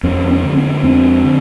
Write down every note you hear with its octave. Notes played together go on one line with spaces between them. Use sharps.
F2 B3 C#4
B3 C#4
D3
B3 C#4
F2 C4 D4
D3